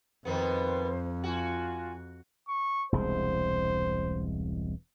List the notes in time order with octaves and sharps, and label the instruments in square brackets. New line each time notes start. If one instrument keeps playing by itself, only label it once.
[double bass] F2 [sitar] B2 D#3 B3 [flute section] C5
[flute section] F4 G#5 [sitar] F#4
[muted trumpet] C#6
[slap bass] E1 C2 G#3 [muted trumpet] C5